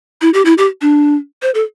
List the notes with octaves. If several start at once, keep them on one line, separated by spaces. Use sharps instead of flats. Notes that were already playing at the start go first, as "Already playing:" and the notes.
E4
G4
E4
G4
D4
C5
A4